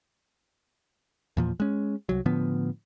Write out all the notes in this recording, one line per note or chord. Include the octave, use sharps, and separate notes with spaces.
E2 A#2 F3
G#3 C#4
C2 F#3
A2 D3 F3 B3